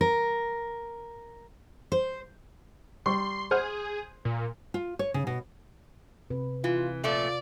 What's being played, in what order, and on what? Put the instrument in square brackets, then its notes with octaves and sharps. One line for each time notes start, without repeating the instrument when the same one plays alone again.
[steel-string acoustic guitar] A#4
C5
[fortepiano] G3 C#6 [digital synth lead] C6
[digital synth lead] G#4 [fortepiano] C5 F#5 F6
[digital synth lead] A#2
[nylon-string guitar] F4
C#5
C#3
B2
[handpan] C3 B4
[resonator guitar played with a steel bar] E3 [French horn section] F4
[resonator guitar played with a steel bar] A#2 F3 A3 [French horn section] F4 [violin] D5